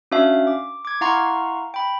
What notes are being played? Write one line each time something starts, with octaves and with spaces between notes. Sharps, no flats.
C#4 D4 F#4 E5 F5
D6
D6 G#6
E4 F5 F#5 A#5 C6 C#6
G5 B5